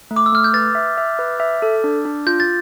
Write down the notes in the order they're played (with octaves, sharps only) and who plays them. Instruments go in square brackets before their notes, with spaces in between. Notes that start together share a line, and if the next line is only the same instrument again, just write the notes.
[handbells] A3
[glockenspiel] D6
E6
[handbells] A3 [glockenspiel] F6
[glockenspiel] G6
[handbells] B4 [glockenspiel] A6
[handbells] E5
E5
B4
E5
A4
D4
D4
[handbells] F4 [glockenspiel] G6
[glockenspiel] A6